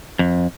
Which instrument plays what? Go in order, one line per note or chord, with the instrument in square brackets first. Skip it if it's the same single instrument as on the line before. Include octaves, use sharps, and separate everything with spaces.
[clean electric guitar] F2